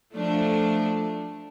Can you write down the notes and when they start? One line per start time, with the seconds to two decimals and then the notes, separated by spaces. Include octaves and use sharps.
0.15 F3 A3 D4